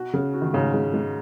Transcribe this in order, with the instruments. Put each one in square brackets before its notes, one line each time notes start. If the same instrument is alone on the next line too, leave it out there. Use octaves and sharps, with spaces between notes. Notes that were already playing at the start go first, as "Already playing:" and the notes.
Already playing: [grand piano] B2 [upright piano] F#4
[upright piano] C#3
F#4
[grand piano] D#3
[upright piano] G#2 [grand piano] C#3
[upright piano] G#3
G#3